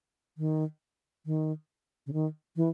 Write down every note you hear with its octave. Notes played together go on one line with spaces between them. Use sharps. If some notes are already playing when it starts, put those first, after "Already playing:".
D#3
D#3
C#3
D#3
E3